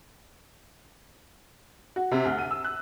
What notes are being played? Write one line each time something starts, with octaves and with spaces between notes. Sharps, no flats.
F#4
C3
D2
D#7
E6
F#6